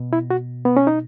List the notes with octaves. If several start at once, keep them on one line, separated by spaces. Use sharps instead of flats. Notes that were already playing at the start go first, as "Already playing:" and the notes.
Already playing: B2
E4
F#4
B3
C#4
D#4